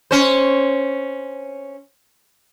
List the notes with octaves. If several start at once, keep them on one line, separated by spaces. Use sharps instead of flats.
C#4 C5